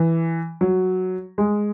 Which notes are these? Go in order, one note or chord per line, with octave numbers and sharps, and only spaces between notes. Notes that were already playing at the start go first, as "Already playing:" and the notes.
Already playing: E3
F#3
G#3